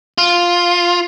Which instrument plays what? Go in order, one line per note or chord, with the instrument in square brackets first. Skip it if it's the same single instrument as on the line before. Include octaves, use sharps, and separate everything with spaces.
[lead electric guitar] F4